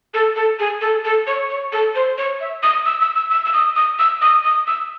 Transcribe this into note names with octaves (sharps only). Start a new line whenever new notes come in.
A4
A4
G#4
A4
A4
C#5
C#5
A4
C5
C#5
E5
D#6
E6
E6
E6
E6
E6
D#6
D#6
E6
D#6
D#6
E6